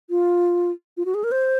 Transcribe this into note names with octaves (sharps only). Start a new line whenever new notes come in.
F4
F4
F#4
G#4
A#4
C5